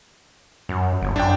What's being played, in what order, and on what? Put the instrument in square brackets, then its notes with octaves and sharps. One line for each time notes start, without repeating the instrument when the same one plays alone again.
[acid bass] F#2
G1
[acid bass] F#2 [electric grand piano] D4 G5